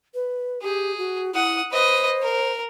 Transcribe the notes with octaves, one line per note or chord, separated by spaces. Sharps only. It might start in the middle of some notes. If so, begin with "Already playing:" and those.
B4
G4 G#4
F#4
E4 F#5 D#6
B4 C5 D#5
A#4